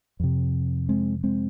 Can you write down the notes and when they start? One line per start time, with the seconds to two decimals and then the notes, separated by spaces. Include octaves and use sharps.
0.20 F2 C3
0.89 G#3 C4
1.24 G#3 C4